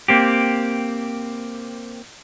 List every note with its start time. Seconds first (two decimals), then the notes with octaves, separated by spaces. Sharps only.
0.08 A#3 C4 G4